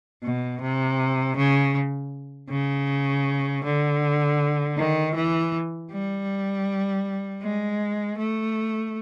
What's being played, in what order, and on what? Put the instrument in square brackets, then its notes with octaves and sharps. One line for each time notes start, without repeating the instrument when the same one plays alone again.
[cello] B2
C3
C#3
C#3
D3
D#3
E3
G3
G#3
A3